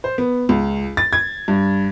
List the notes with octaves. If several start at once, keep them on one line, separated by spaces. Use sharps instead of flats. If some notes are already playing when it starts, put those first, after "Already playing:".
C5
B3
C#2
A6
G#6
G2